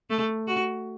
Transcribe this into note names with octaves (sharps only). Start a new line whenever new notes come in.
A3
F#4